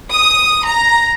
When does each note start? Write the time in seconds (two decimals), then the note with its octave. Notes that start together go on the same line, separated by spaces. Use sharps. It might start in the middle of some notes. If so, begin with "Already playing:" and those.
0.12 D#6
0.64 A#5